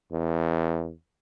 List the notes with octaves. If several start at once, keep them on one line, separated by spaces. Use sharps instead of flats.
E2